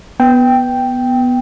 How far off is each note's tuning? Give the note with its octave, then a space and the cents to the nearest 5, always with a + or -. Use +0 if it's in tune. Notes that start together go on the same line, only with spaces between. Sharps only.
B3 +0 G5 +0